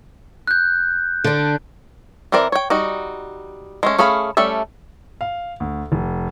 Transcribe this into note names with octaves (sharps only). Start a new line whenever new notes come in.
F#6 G6
D3 D4
E3 C4 E4 A#4 D5
C#5 G5
G3 D#4 F#4
G#3 A3 C#4
A3 C#4 G#4 F5 B5
G3 A3 C#4 A4 E5
F5
D2
F1